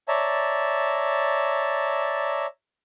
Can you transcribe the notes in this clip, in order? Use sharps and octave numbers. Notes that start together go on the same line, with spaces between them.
C#5 D5 E5 A5 A#5